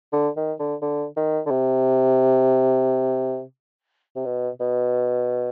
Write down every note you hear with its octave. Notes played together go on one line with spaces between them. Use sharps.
D3
D#3
D3
D3
D#3
D3
C3
C3
B2
B2